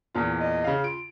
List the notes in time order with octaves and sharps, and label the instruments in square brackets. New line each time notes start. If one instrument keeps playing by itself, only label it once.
[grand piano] E2 A#2 F4
[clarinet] D#5
[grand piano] C#3 F5
[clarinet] F4 [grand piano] D7